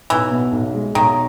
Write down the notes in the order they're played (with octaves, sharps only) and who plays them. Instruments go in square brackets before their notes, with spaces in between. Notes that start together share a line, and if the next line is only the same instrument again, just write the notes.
[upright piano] B1 [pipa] E3
[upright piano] B2
B1
G#3
[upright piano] B1 [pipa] D#3